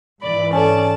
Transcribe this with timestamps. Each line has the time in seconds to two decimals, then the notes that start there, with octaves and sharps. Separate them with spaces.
0.21 G#2 E3 D5 B5
0.53 C#4 A4 C#5 D5 G#5 A5